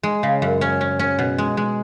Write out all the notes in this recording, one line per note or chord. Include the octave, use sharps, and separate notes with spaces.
G#3
C#3
F#2
C#4
C#4
C#4
B2
G#3
G#3